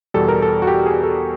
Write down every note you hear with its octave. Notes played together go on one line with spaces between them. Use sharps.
E2 B2 G3 A4
A#4
A4
F#4
G4
G#4
A4